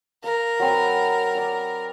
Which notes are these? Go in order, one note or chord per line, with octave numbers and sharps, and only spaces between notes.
A#4 F5
F#3 C4 B4
D5 E5